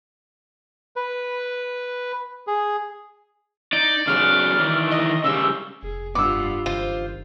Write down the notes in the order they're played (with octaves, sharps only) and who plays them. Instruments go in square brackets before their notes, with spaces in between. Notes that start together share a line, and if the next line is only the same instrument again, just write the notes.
[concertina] B4
G#4
[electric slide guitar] D#4 [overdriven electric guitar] D5
[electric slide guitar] C#3 F#3 B3 [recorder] F6
[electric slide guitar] D#3 E3
[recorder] D#5
[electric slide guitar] C#3 G3 [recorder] E6
[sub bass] F1 [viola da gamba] G#4
[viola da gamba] G2 F4 [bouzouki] B3 [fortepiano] D6 E6
[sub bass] F#1 [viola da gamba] D#3 [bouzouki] F4 C5